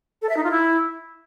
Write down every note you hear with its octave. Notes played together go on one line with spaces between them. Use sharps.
A4
E5
D#4
F4
E4